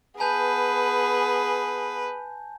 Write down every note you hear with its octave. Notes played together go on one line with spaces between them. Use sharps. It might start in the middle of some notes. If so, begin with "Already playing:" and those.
B3 G#4 B4 G#5 A5 G6